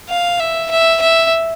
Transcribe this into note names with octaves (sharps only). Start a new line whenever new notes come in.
F5
E5
E5
E5